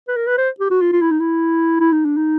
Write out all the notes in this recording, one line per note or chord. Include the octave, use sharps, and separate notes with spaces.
B4
A#4
B4
C5
G4
F#4
F4
F4
E4
D#4
E4
E4
D#4
D4
D#4